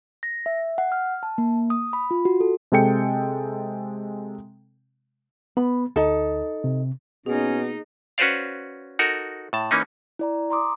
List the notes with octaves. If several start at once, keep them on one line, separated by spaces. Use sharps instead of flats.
A#6
E5
F#5
F6
A5
A#3
D#6
B5
F4
F#4
A4
C3 G#3 A4 G5 C#7
B3 B5
D2 D#4 A4
C3
B2 A#3 C#4 D#4 G#4
C#4 F#4 B4 C5 D5 F5
D#4 F#4 A4 A#4
A2 A5
E3 A#3 C#4 D#4
E4 D5 A#5
A#5 C6 D6 D#6